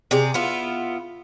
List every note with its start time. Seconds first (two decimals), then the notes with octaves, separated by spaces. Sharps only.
0.11 C3 G#4 D5
0.34 B3 E4 F4